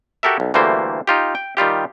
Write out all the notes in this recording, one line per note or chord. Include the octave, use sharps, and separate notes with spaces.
F#4 G4 A4 A#4 E5
B1
D2 E3 G3 A3 A#3 C5
D#4 F4 G4
G5
D#3 G3 F4 G4